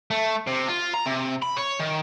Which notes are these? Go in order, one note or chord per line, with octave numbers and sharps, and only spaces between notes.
A3
C3
F4
A#5
C3
B5
C#5
D#3